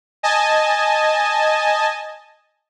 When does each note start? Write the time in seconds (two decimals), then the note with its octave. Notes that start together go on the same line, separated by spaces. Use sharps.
0.23 D#5 G#5 A5